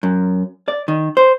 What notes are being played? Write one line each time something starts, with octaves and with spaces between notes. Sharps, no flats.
F#2
D5
D#3
C5